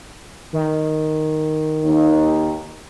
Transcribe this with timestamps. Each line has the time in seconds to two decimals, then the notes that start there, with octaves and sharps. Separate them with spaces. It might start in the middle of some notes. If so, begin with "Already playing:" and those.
0.53 D#3
1.84 D#2 D#4